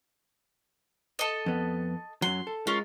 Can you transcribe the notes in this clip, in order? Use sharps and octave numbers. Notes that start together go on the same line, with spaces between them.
A4 D#5
F2 B3
F#2 F#3 C6
A4
G#3 C#4 F4 A#4